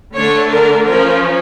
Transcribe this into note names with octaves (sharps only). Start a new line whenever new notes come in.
D3 A3 D4 C#5
A#4
F3 C#4 A#4